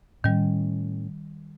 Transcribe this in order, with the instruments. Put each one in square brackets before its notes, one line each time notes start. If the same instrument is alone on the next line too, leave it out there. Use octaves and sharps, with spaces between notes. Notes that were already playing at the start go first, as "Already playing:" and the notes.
[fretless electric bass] A2 C#4 [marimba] D#3 G3